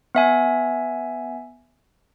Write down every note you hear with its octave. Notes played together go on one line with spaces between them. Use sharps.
B3 E5 G#5